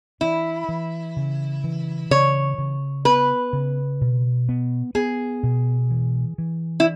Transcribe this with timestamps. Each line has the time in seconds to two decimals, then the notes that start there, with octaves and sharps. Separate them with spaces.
0.21 E3 E4
0.69 E3
1.17 C#3
1.64 E3
2.11 C#3 C#5
2.58 C#3
3.05 B3 B4
3.53 C#3
4.01 B2
4.49 B3
4.95 B3 G#4
5.43 B2
5.90 E3
6.38 E3
6.80 E4